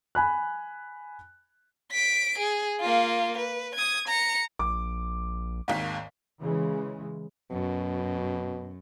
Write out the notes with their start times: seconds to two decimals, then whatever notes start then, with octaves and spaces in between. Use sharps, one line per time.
0.15 G#5 B5 F#6
1.92 B6 D7
2.39 G#4
2.80 A#3 F4
3.38 B4
3.75 D#6 G#6
4.08 A#5 C#7
4.59 A#1 D6
5.68 G#1 D#2 G#2 F5 B6
6.42 C#3 E3 G#3
7.51 F#2 B2